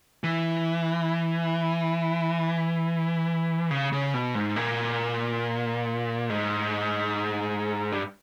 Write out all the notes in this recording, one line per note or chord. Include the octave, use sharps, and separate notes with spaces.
E3
C#3
C#3
B2
G#2
A#2
G#2
G2